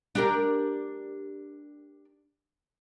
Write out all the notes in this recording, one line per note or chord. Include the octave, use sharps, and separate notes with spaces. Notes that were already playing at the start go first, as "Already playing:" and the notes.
D4 G4 A#4